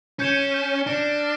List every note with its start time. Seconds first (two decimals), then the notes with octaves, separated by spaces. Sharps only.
0.19 C#4 G6 C#7 E7 G7
0.54 G6 C#7 E7 G7
0.87 D4 F6 A#6 D7 G7
1.20 F6